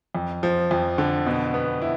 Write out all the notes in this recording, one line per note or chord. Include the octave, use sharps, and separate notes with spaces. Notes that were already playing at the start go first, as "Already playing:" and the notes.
F2
F3
F2
D3
B2
B3
E4